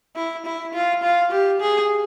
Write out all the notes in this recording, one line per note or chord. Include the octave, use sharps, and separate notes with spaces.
E4
E4
F4
F4
G4
G#4